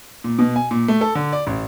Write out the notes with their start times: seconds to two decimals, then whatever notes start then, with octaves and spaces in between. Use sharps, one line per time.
0.24 A#2
0.39 B2
0.56 G#5
0.71 A#2
0.88 A3
1.01 A4
1.15 D3
1.33 D5
1.47 A1